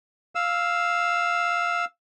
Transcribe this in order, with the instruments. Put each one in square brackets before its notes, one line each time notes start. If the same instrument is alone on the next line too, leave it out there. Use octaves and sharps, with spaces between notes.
[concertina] F5 E6